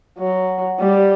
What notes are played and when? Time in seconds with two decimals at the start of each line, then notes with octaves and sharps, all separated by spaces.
0.18 F#3
0.80 G3